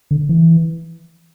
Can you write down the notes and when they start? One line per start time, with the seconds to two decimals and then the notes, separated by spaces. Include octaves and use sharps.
0.11 D3
0.29 E3